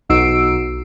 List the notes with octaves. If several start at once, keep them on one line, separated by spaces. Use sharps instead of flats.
B1 D#4 F#4 E6 C7 D7